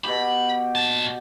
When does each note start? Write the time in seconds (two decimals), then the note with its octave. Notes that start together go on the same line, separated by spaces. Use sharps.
0.04 B2 G4 B5
0.75 A#2 A5